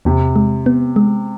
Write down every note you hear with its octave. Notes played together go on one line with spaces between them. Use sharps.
E2 C3
G#3
B3
G#3